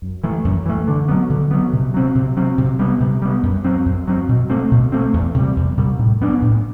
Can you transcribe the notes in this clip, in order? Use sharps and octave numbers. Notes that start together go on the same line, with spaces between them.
F#2
E3 A3
F#2
E3 A3
D3
F#3 B3
D3
F#3 B3
C3
F#3 C4
C3
F#3 C4
C3
G3 B3
C3
G3 B3
F#2
F#3 C4
F#2
F#3 C4
B2
A3 C4
B2
A3 C4
E2
C3 G3
E2
C3 G3
A2
F#3 B3 D4
A2